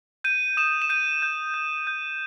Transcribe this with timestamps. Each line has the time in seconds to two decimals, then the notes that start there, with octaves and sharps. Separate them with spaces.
0.24 G6 D#7
0.57 D#6 E7
0.82 E7
0.90 G6 D#7
1.22 G6
1.54 G6
1.87 G6